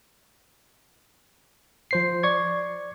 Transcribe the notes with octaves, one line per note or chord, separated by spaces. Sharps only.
F3 C5 C7
D5 C#6 G#6